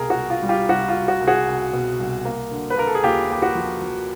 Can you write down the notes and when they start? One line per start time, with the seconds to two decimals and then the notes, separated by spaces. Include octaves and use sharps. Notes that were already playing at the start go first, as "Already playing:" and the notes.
Already playing: C2 B2 G3 G#4 A#4
0.10 F#4
0.17 C2
0.30 F4
0.43 G3
0.49 F4 G4
0.69 C2 F#4
0.88 F4
0.95 C2
1.08 F#4
1.21 C2
1.27 F#4 G#4
1.47 C2
1.73 B2
1.99 C2
2.25 A#3
2.51 D3
2.70 B4
2.77 A#3 A#4
2.87 A4
2.95 G#4
3.03 D#2 F4 G4
3.30 A#3 G4
3.42 F#4
3.55 F3
3.81 F3